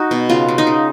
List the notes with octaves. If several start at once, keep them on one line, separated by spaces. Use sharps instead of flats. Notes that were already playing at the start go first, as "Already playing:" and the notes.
Already playing: D#4 F#4
B2
C#3 F4
C#3
D#4
C#3